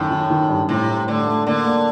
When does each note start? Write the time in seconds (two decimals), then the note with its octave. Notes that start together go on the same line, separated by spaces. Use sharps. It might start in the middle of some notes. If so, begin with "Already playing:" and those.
Already playing: F#2 A2 D#3
0.11 D#3
0.30 D#3
0.49 G2
0.69 A2 C3
0.89 A2
1.08 D3 A3
1.27 A3
1.46 D3 A#3
1.66 A#3